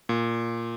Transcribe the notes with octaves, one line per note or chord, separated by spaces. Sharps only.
A#2